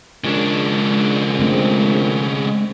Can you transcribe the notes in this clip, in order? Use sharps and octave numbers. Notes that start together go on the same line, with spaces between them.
A#1 C#3 G#3 D4
A3 C4